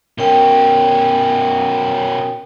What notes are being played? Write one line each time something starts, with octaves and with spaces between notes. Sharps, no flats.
B2 C#4 A#4 G5